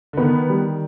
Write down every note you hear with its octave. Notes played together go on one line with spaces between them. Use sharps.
D3
D#3 B3
G3